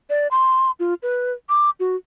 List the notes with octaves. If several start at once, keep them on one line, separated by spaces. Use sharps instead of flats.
D5
C6
F4
B4
D6
F#4